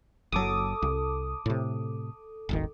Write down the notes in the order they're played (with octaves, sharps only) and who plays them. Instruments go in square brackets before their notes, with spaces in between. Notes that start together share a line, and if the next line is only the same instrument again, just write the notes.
[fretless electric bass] F#1 F#3 [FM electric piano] A4 D6 D#6
[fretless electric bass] C2
A2 C3
D#1 G#1 D#3